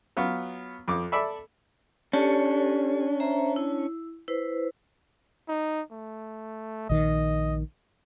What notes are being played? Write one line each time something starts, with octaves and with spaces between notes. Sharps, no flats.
F#3 B3 F4
F2 D6
A4 D5 E5 B5
C#4 D4 G4 A4 C#5
C5 E5 A#5
E4
E4 B4 C5
D#4
A3
A#1 D#3 D#5